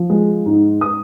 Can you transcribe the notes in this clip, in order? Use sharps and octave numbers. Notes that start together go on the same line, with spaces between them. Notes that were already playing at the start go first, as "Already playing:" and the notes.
Already playing: F3
G#3
G#2
D#6